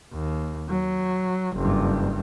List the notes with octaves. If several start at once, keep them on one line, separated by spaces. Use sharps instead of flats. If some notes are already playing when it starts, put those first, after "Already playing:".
D#2
F#3
F#1 G2